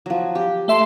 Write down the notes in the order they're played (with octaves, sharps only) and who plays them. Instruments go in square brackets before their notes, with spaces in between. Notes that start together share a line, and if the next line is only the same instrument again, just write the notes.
[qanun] F3 F#3
G4
[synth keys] A3 E5 C6